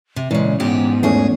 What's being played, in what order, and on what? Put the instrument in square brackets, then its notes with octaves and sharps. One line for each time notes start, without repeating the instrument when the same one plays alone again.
[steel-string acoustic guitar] C3
[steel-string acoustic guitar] A#2 C#3 [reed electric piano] E3 C#4 [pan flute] G#3
[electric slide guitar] G#2 [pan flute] B3 [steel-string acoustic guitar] G4
[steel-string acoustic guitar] E2 G#4 [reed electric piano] E3 A3 C#4